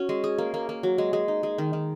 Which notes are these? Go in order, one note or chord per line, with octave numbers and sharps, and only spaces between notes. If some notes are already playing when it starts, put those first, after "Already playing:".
Already playing: C#4 F#4
G#3
G#4
A#3
A#3
A#3
F#3
G#3
G#3
D#4
G#3
D#3
D#3